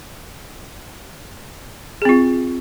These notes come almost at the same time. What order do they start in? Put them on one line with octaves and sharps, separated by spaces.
G#4 C4 F4